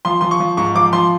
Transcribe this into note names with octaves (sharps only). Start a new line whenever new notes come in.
F3 C6
F3 C6
C#6
F3
G#2 C#6
F3 D6
F3 C6